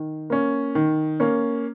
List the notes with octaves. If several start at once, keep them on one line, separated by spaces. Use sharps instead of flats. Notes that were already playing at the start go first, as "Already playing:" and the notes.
Already playing: D#3
A#3 C#4
D#3
A#3 C#4